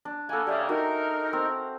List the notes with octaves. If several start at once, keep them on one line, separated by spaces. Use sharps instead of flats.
D4
A#3 B3 A4 G#5
C#3 A#3 G4 D5 E5
D#4 F#4 A#4
C4